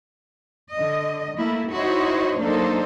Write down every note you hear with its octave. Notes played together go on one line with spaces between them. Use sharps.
D3 D#5
A3 A#3 E4
D#4 E4 F#4 C5 C#5 D#5
F#3 A#3 D4 D#4 A4 C5